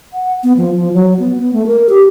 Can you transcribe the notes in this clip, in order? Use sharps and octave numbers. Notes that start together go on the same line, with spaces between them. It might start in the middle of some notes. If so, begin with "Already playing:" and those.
F#5
B3
F3
F3
F#3
B3
B3
A3
A#4
G4